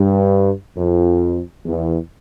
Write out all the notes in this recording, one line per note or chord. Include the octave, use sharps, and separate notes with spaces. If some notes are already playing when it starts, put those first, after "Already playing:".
Already playing: G2
F2
E2